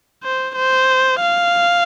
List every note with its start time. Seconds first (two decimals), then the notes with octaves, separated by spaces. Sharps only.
0.23 C5
0.56 C5
1.21 F5